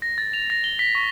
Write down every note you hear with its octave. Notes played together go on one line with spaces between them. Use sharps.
A#6
A6
F7
A#6
G7
B6
C#6